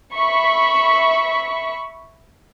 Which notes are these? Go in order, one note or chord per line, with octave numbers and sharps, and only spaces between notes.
E5 B5 C#6